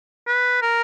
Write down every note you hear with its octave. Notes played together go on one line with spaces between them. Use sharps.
B4
A#4